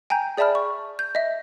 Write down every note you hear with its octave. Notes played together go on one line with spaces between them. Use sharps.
G5 G#5 A#5 G6
G#4 D5 E5 A5 B5 F6
C#6
G6
D#5 E5